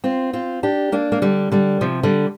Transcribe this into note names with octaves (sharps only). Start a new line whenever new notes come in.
C4 F4
C4 F4
D4 G4
A#3 D4
A#3
D3 G3
D3 G3
C3 F3
D3 G3